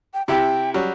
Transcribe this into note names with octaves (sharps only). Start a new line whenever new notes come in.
G5
C3 E4 G4 G5
F#3 G3 C#4